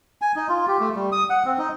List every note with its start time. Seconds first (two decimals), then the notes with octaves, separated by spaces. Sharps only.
0.21 G#5
0.36 D#4
0.49 F4
0.67 G4
0.80 A3
0.95 G3
1.12 D#6
1.30 F#5
1.45 C4
1.58 D#4